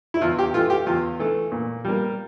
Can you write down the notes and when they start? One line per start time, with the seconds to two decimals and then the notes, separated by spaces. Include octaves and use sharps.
0.14 E4
0.21 E2 F4
0.39 G4
0.54 E3 A3 F4
0.70 G4
0.86 E2 F4
1.19 E3 A3
1.52 A#2
1.85 G3 A#3